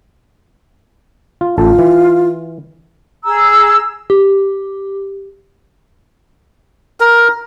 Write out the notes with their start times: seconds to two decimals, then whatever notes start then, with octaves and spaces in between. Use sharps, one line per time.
1.41 F4
1.58 A1 F4 A4 A5
1.78 E3
3.25 G#4 A#5 E6
4.10 G4
7.00 A#4